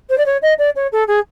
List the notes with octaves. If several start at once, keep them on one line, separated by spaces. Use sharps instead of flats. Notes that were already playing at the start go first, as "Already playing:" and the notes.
C5
D5
C#5
D#5
D5
C#5
A4
G#4